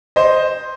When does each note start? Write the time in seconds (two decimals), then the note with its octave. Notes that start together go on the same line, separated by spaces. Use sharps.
0.16 C5 D#5